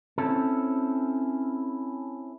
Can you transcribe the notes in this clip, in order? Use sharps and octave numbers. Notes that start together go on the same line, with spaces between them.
C4 C#4 E4 A4